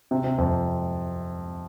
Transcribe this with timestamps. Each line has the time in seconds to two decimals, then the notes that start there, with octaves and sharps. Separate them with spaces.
0.11 C3
0.24 C3
0.38 F2